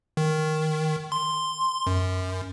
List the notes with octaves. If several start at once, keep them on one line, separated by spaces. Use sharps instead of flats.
D#3
C6
F#2